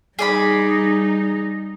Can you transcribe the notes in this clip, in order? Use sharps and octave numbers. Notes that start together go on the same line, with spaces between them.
G3 D#4 G#4 D5 B5